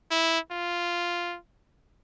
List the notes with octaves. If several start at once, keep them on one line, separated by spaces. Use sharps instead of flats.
E4
F4